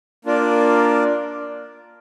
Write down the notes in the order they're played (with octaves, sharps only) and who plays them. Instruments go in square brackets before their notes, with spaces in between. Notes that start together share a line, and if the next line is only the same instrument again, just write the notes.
[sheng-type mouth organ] A#3 D4 F4 A#4 D5